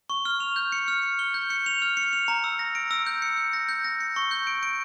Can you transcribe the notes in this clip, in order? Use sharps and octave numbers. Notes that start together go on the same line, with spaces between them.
C#6
F6
F7
G6
C#7
F6
C#7
G7
G6
C#7
F7
F6
C#7
F7
A#5
E6
A#6
D7
E6
G6
C#7
G6
A#6
G6
A#6
C#7
C#6
G6
D7
D7